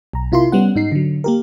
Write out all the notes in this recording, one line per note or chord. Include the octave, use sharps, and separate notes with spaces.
B1 A#5
C3 E4 F4 A#4 C6
G3 B3 C#4 F#5
G#2 D#4 C7
D3 F#3
A#3 G4 A#4